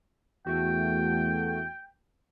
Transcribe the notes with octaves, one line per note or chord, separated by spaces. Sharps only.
E2 A3 F#4 G5